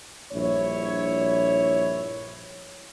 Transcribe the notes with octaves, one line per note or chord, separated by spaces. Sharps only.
A#1 G2 E4 C#5